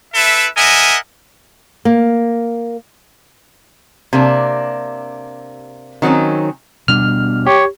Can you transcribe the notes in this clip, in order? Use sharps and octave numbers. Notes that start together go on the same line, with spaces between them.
E4 A4 B4 E5
A#4 D#5 E5 F#5 G#5
A#3
C3 A#3 D4
D#3 F#3 C4 C#4 D#4
B2 G3 D4 F6
G4 C#5